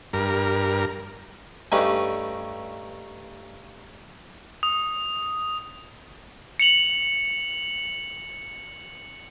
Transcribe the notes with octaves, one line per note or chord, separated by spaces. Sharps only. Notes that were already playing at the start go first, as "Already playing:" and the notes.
G2 A#4
G2 A3 C#4 D#4 G4 B4
D#6
C#7 F7 F#7